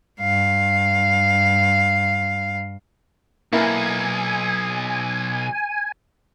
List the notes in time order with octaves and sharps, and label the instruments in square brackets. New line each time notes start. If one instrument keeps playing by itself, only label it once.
[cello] G2 F5
[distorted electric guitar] B1 [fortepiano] A#3 E4 [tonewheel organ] G#5